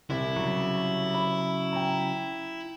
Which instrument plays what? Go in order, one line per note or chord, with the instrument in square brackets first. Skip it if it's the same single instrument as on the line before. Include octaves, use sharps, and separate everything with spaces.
[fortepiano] C2 [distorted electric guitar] E4
[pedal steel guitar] C#3 F#3
[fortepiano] B5
G5 A#5